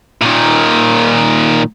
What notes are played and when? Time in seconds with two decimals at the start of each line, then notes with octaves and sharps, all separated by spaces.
0.22 A#2 D#3